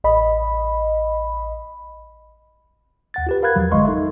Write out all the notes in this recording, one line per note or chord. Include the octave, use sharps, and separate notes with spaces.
A1 D#5 B5
D#2 F#5 A6
F4 G4 B4
A#4 F5 B5 F#6 G#6
E2 F3 F#3
G1 G#3 D#5 F5 C6 C#6
D#4 A4 E5